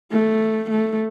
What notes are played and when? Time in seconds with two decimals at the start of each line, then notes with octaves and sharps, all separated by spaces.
0.12 A3
0.71 A3